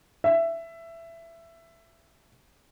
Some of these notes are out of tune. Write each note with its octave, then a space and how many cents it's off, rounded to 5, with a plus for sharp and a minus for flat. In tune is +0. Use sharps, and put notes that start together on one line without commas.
E5 +15